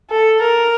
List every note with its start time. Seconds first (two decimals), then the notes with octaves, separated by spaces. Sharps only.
0.10 A4
0.42 A#4